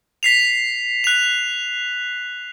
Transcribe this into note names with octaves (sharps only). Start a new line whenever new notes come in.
B6 C7 F7
F#6 F7